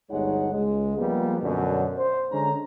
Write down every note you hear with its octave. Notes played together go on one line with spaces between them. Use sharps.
G1 D2 G#3 D#4 C#5 F#5
C#2 G#3
F3 G3 G#3 A#3 B3
F#2 B2 D3
C5
D3 G#3 C#4 D4 A#5